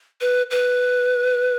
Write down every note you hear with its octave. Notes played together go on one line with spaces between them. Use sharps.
B4
B4